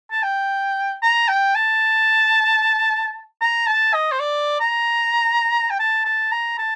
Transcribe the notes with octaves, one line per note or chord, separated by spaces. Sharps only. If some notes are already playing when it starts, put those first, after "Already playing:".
A5
G5
A#5
G5
A5
A#5
A5
D#5
C5
D5
A#5
G5
A5
A5
A#5
A5